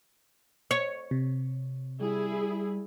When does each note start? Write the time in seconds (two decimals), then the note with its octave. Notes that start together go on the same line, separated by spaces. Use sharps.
0.71 C#5
1.11 C3
2.01 G3 E4 G#4